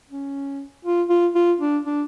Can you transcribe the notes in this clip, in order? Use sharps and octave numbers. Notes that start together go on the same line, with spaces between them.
C#4
F4
F4
F4
D4
D4